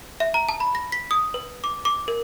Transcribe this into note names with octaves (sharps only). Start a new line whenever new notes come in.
E5
A#5
A5
B5
A#6
B6
D#6
B4
D6
D6
A#4